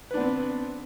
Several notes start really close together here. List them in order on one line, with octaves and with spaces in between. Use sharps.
B4 D4 B3 C4